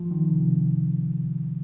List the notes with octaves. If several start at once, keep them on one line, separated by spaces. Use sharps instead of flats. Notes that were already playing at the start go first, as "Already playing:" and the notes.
Already playing: F3
D#3
C3
C3